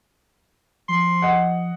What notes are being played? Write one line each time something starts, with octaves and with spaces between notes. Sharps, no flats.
F3 C6
D#5 F#5